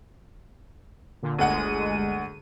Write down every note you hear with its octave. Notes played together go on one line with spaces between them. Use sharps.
A#2 D3
G1 D2 G#3 F#5 D#7